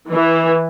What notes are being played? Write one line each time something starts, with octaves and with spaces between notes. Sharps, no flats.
E3